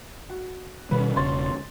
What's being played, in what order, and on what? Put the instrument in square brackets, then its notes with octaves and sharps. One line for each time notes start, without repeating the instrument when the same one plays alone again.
[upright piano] F#4
[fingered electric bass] B2 D#3 G3 [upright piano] C#4 B4
[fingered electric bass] E1 C#3 [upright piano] C#5 C6 A6